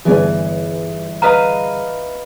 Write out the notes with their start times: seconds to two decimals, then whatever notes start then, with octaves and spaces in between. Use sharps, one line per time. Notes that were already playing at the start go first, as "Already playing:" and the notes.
0.05 G1 E3 B3 G#4 D5 G#5
1.22 B4 D#5 F5 A#5